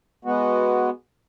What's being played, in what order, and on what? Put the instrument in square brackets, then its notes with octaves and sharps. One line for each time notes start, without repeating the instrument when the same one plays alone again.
[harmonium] G#3 B3 F#4